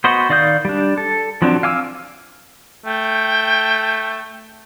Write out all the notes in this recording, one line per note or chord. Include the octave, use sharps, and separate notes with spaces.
B3 F#4 C5 D#5
D#3 D5 F5 D#6 G6
G3 D4
A4
F3 F#3 C4 D4
F5 G#5 D6 E6
A3 G5